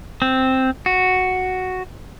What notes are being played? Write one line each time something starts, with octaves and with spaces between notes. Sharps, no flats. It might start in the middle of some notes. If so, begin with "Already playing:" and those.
C4
F#4